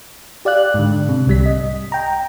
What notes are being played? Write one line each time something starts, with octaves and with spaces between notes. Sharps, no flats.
G4 D5 F5 F#6
G#2 D3
C3
C2 G3 B6
D#5
G5 A#5